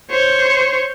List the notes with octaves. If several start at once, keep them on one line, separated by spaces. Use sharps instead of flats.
C5 C#5